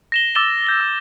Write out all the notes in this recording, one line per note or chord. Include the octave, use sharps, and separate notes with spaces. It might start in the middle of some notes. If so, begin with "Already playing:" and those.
A#6 E7 G7
D6 E6 A6 E7 G7
G6 G7
E6